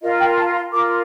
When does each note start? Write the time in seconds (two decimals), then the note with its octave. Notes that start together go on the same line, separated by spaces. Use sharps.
0.02 F4 A#4 D#5
0.20 G5
0.37 A5
0.55 C6
0.72 F4 A#4 D6